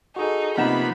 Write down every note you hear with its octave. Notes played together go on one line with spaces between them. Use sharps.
D#4 F#4 G#4 A4
C3 F3 A#3 B3 D#4 F#5 B5 E7